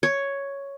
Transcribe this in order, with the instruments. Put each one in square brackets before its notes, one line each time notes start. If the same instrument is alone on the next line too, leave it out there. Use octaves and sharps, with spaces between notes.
[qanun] C#5